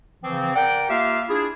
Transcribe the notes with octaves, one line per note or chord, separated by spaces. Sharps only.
C#3 E3 F3 C4
A#4 D5 F#5 G5
A#3 F4 G4 E5 F5
D4 E4 F4 G#4